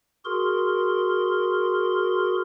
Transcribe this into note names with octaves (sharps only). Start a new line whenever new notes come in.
F#4 G#4 A#4 C6